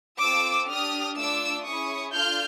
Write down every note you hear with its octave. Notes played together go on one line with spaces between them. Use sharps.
C4 F4 A4 D6 E6
D4 G4 D#6 F6
A3 D4 F4 D6 E6
C#4 E4 G#4 C#6 D#6
D4 F4 A4 F6 G6